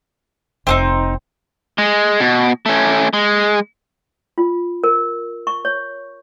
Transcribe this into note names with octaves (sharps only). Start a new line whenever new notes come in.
F1 C4 D4 D#4
G#3
B2
A3 C#4
G#3
F4
A#4
C#6
C#5